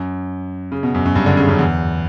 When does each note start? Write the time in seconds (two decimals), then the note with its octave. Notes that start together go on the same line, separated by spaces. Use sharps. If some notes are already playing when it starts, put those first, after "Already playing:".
Already playing: F#2
0.72 C#3
0.83 B2
0.95 F#2
1.05 F#2
1.15 G2
1.26 D3
1.37 C#3
1.49 F#2
1.59 E2